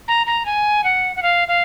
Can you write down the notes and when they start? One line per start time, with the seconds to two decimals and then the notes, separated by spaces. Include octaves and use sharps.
0.08 A#5
0.27 A#5
0.46 G#5
0.84 F#5
1.16 F#5
1.23 F5
1.48 F5